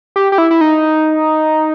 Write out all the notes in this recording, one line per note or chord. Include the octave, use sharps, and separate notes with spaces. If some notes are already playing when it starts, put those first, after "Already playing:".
G4
G4
E4
E4
D#4